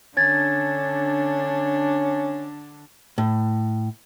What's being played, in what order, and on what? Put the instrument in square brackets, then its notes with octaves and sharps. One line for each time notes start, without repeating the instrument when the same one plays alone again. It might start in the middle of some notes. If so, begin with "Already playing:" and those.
[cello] D3 D4 [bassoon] C#4 [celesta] G#6 A6
[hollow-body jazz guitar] A2